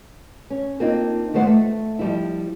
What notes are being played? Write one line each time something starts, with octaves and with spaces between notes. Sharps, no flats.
C#4
A#3 C4 D4 D#4 F4
G2 D#3 A3 B3 C5 F#5
A3
F3 G3 E4